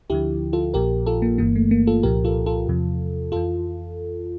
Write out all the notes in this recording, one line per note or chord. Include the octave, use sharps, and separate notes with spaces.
D2 D3 F3 E4 G4
F4 A4
A#1 A#2 F3 G4 A#4
F4 A4
A#3
G1 G2 E3 A#3
A3
A#3
F4 A4
C2 A#2 F3 G4 A#4
F4 A4
F4 A4
E2 C3 F3
F2 E3 F4 A4